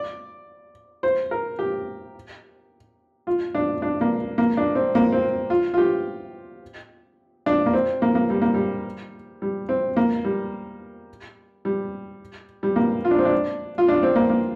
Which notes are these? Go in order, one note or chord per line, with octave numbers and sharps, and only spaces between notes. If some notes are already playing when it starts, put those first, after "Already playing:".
Already playing: D5
C5
A#4
G4
F4
D4
D4
A#3
A#3
D4
C4
A#3
C4
F4
F4
G4
D4
A#3
C4
A#3
A#3
G3
A#3
G3
G3
C4
A#3
G3
G3
G3
A#3
F4
D4
C4
D4
F4
D4
C4
A#3
A#3